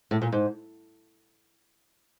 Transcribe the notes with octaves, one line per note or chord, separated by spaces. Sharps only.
A2
A#2
G#2